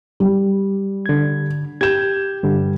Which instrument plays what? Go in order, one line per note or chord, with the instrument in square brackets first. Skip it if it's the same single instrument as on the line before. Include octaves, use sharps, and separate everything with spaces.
[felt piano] G3
[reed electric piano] D3 G#6
[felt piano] G4 E7 [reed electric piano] G6 G#6
[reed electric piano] G2 D3 G3